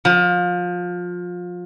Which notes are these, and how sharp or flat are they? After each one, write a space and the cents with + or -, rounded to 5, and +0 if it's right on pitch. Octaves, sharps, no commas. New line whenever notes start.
F3 +25